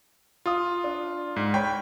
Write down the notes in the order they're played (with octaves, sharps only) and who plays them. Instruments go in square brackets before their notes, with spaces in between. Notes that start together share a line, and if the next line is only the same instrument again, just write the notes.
[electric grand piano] F4 [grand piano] F5 D#6
[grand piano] D4
[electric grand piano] G#2
[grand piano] C#5 B5 [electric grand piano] G5